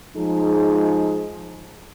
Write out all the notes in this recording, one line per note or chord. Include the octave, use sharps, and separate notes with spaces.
F3 G#3 D#4 G#4